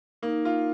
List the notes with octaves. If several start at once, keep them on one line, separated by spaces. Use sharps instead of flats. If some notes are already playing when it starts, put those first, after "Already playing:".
A#3 D#4
F4